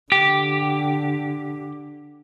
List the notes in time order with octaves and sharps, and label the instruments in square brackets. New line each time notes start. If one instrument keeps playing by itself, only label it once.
[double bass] D3 [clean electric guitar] G4